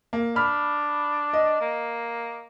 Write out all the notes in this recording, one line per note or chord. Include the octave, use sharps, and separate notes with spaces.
A#3
D4 B5 F6
D#5
A#3